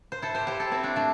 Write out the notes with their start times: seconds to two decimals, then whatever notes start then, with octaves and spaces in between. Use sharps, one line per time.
0.12 C5
0.22 E4 A4
0.35 G4 C5
0.47 G4 C5
0.60 E4 A4
0.72 C4 E4
0.83 A3 D4
0.96 A3 D4